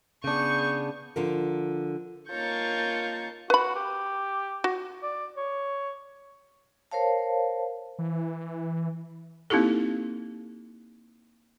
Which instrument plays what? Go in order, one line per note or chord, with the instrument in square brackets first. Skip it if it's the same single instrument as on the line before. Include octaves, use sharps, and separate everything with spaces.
[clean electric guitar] C#3 D4 [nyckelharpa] B3 G#4 [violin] C#6 [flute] G6
[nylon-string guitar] D3 F3 A#4
[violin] A#3 C#6 [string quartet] D#4 A#4 C#5 [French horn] F4 [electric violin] A5 G6
[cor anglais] F#4 [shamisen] B4 B5
[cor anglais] G4
[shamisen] F#4
[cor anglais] D5
C#5
[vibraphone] A#4 C5 C#5 F5 A5
[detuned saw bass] E3
[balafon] A#3 C4 D#4 E4 G4 A4